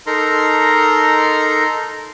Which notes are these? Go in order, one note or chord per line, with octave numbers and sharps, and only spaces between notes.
D#4 A4 A#4 A#5 C6